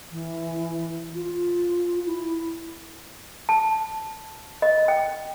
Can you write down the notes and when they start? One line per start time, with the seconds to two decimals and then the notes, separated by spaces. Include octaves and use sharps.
0.11 E3
1.15 F4
2.06 E4
3.49 A5
4.62 D#5
4.88 G5